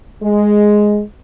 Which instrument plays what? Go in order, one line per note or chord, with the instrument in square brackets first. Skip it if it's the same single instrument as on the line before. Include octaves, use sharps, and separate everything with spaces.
[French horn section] G#3